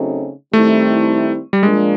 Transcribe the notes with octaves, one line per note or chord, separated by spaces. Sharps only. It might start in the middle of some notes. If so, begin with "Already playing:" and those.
Already playing: C#3 F#3 A3 C4 D#4
D#3 G3 A3 C4 E4
G3
A#2 F3 G#3 A#3 D4 F4